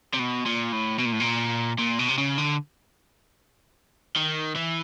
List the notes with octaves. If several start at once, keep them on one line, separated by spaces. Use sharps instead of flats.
C3
B2
A#2
A2
B2
A#2
A2
A#2
A#2
B2
C3
C#3
D3
D#3
E3